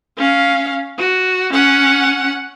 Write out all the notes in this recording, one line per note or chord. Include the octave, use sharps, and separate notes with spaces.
C#4 F5
F#4
C#4 F#5